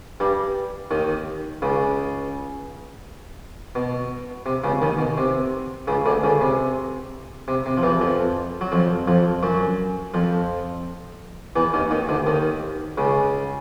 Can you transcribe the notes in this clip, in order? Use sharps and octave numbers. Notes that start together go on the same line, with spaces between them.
G2 G3
D#2 D#3
C#2 C#3
B2
C3
C#2 C#3
D#2 D#3
B2
C3
C#2 C#3
D2 D3
C#2 C#3
C3
C3
C3
F3
E2 E3
F2 F3
F#3
F2 F3
F2 F3
F#2 F#3
F2 F3
E2 E3
D#2 D#3
D#2 D#3
D2 D3
D#2 D#3
C#2 C#3